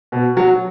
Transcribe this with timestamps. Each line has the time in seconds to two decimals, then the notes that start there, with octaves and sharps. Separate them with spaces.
0.12 B2
0.37 F#3